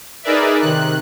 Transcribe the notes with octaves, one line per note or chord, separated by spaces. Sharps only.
D#4 G#4 A#4 B4 D5 E5
C3 D#3 F#6